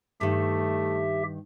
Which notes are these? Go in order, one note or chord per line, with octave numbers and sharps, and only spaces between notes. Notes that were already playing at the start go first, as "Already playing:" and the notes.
G2 D#3 A3 G4 E5